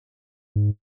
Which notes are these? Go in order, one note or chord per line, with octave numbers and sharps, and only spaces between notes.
G#2